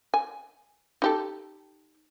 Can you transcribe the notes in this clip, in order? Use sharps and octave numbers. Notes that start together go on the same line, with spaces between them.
G#5
D#4 G4 A4